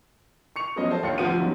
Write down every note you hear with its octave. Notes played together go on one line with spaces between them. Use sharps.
C#6 C#7 F7
F3 F#3 G#3 B3 C#4 D#5
A4 C5 A5
D#2 D4 F4 C#5 C6 C#7
D2 C3 F3 F#5 D#7
D#3 F#3 G3 B3 C#4